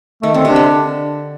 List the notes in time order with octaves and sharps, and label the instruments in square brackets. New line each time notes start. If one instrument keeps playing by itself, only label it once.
[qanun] D#3 [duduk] A3
[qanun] D3 [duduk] C4
[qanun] C3 [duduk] D4
[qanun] D3